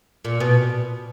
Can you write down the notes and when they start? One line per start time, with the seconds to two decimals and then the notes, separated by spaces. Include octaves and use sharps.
0.25 A#2
0.40 B2